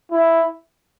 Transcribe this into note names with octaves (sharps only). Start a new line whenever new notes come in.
E4